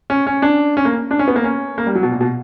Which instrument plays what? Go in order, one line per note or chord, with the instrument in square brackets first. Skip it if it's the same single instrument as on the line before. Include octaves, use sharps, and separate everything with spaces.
[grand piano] C#4
C#4
D4
C#4
A#3
D4
C#4
B3
A#3
C#4
A#3
G3
F#3
B2
A#2
B2